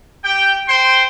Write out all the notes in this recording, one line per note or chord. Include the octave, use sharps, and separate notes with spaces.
G4 G5
C5 G5 C6